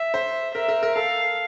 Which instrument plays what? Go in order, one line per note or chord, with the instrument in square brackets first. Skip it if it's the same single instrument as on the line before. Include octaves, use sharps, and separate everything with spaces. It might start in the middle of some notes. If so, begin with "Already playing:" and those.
Already playing: [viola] E5
[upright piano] C5
[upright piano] A#4 [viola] E5
[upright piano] A#4
A#4
[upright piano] A4 [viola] F5